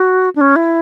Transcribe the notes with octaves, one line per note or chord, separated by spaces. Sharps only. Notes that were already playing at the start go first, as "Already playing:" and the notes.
Already playing: F#4
D4
C#4
E4